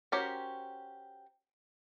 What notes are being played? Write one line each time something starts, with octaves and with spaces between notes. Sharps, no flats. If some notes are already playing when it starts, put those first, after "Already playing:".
C#4 F#4 G4 A#4 C5